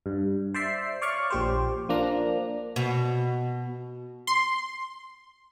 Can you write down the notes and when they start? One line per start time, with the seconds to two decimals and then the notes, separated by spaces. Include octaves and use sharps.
0.06 G2
0.54 C5 D5 E5 C7
1.02 C#5 D5 F5 C#6
1.30 A#1 G4 C5
1.89 F3 A#3 D4 A#5
2.76 B2
4.27 C6